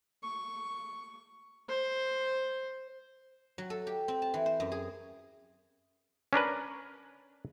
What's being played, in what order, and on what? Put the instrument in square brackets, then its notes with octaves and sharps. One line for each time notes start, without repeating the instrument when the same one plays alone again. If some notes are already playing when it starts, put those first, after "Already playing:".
[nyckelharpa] C#6
C5
[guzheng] F#3
A4
G4
C4
A5
E3
C5
F#2
G#4
[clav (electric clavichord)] C#4 D4 A#4 B4